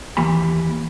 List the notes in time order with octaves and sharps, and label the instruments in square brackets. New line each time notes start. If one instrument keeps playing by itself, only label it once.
[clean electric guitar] D#2 E3 A#3 G4 G#5 B5